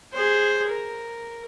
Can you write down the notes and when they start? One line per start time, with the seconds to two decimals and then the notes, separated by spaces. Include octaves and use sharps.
0.13 G#4 C5
0.68 A#4